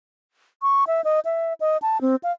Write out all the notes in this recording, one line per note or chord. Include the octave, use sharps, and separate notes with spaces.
C#6
E5
D#5
E5
D#5
A5
C4
F5